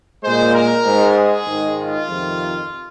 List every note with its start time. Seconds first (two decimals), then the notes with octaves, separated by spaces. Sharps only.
0.23 A#2 G#3 C5
0.54 A#4
0.84 G#2 G#3
1.16 G#4
1.47 G#2 D#3 G#3
1.78 F4
2.09 F2 C3 D#3